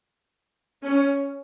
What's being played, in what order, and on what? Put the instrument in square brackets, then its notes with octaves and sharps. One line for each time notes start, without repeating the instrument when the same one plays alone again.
[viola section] C#4